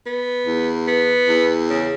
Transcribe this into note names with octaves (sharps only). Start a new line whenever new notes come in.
B3
E2
B3
E2
C#3